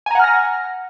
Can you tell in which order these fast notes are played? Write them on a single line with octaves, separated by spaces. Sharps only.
G#5 A#5 F#5 F6 A#6